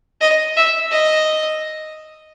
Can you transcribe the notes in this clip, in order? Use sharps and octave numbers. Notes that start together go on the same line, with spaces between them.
D#5
E5
D#5